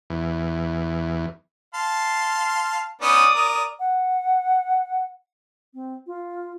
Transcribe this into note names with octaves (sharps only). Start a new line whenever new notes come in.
E2
F5 A5 C6
B3 C#4 D#4 D5 D#6
A#4
F#5
C4
F4